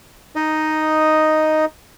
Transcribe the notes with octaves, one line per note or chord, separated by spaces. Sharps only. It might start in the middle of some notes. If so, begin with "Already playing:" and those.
D#4 D#5